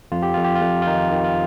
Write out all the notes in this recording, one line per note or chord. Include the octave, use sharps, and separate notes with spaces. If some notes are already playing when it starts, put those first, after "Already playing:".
F2 F4
G4
F2 F4
G4
F4
F2
F4
D#3 D#4
D#3
F4